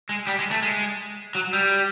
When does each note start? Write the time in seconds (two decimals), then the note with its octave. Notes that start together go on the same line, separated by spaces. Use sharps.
0.09 G#3
0.27 G3
0.39 G#3
0.51 A3
0.62 G#3
1.35 F#3
1.53 G3